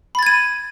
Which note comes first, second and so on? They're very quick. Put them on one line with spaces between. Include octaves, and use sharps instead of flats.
B5 A6 G#6 D#7